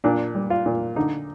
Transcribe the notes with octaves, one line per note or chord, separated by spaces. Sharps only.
A#2 D4
G3
F4
A#2
D3 D#4